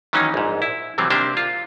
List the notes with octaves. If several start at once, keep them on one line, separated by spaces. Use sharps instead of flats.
D#3 E3 F#3 A#3 C#4 D#4
A#1 G#2
E4
C3 E3 F#3 G3 C4
C3 A#3 D4 G4 C5
F4